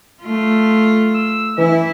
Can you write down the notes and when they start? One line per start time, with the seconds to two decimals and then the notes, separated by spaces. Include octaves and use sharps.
0.23 A3 F4
1.14 E6
1.58 E3 E4